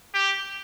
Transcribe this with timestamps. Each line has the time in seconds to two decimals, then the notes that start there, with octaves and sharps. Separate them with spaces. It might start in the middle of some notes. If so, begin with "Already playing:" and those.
0.14 G4